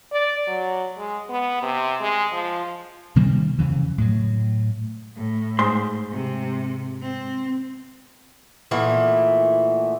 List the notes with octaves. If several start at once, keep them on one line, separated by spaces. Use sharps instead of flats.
D5
F#3
G#3
B3
C3
G#3
F3
C3 D#3 G3 A#3
F2 C#3 E3
A2 F#3
A2
G#2 C5 C6
C3
C4
A#2 E3 A3 B3